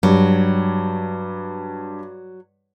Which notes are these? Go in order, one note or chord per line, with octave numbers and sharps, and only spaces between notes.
G2 F#3 G3